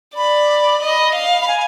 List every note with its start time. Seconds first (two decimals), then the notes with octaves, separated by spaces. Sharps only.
0.16 D5 B5
0.82 D#5
1.15 F5
1.42 B5
1.48 G#5